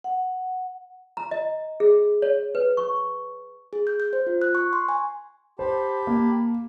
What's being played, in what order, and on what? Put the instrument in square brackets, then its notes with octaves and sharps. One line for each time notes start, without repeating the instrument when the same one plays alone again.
[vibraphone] F#5
[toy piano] A#5
D#5
G#4
C#5
B4
C#6
[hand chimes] G#4
G6
G6
C5
F4
F#6
C#6
C6
G#5
[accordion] G4 A5 B5 [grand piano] C5
[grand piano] A#3